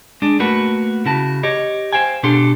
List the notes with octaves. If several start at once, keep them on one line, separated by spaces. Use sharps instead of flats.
G#3 D4
A3 A#3 F#4 B4
C#3 E4 F#4 A5
G4 C#5 D#5
C5 C#5 F5 G5 G#5
B2 D4 G4 A4 C6